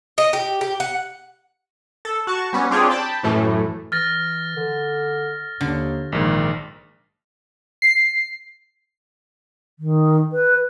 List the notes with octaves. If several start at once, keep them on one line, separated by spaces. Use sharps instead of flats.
D#5
G4
G4
F#5
A4
F#4 A5 C#6
G3 B3 C#4
C4 D4 F4 G4 G#4 C#5
G5 A5 B5
F#2 A2 E3 A3
E3 F6 A6 A#6
D3
D#2 D3
A#1 G#2 D#3
C7
D#3
B4